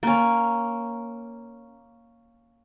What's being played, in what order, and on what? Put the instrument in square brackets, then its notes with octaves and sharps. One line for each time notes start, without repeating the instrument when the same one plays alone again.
[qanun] A#3 C#4